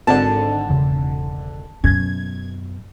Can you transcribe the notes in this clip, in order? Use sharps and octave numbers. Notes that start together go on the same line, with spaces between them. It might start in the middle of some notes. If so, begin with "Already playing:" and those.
G#1 D3 A5
E1 C#3
F#2 B2 C#4 G#6